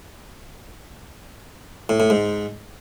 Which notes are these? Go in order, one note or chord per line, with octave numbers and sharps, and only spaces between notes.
A2
A2
G#2